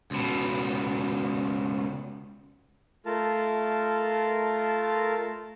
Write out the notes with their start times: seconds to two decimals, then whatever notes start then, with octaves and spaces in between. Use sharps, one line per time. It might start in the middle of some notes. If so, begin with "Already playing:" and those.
0.11 C#2 B2
3.06 A3 F4 A#4 A5